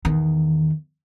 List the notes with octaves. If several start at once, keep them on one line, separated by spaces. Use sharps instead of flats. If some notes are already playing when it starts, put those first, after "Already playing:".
E2 D#3